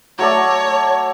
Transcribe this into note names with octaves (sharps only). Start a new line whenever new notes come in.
F#3 A3 C#5 D5